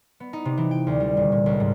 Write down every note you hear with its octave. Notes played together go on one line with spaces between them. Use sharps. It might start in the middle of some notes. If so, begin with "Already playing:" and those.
B3
D#4
C3
E3
G5
D2
G3
D#1
A#2
C#2
G#2